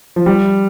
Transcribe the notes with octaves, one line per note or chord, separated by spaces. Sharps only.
F3
G3